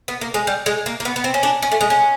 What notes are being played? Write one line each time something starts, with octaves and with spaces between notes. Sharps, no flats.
B3
A#3
G#3
G3
G#3
A#3
A#3
B3
B3
C4
C#4
D4
C#4
A3
G#3
C#4